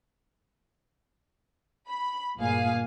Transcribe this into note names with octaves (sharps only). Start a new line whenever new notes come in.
B5
G1 A#2 G#4 F5 G#5